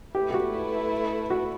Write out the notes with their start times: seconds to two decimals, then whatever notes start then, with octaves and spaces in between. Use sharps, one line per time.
0.15 A3 E4 G4 B4
0.31 G4
0.34 F#4
1.30 F#4